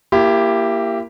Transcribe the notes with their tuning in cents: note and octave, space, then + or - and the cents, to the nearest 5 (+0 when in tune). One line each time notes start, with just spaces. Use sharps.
A#3 +0 E4 +30 G4 +5